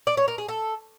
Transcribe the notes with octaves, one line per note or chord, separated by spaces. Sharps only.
D5
C#5
A#4
G#4
A4